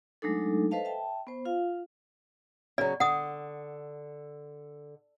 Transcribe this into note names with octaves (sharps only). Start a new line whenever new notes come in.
F#3 G#3 A3 D4 D#4 A4
A4 B4 C5 D#5 F5 A5
E5 G5 A5
B3 C5
F4 F5
C#3 F#3 D5
D3 F#5 D#6